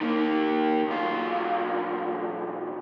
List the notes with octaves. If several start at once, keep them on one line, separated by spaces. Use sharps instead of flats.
D#3 A#3
B1 F4